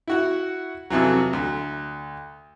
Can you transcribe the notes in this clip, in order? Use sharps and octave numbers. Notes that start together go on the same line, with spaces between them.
E4 F#4 F#5
F2 C3 E3 F#3
D2